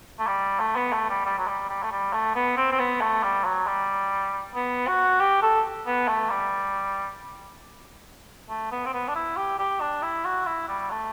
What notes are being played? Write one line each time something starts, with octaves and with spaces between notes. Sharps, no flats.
A3
G3
A3
B3
A3
G3
G3
F#3
G3
G3
A3
G3
A3
B3
C4
C4
B3
A3
G3
F#3
G3
B3
F#4
G4
A4
B3
A3
G3
A3
B3
C4
B3
D4
E4
G4
G4
D4
E4
F#4
E4
G3
A3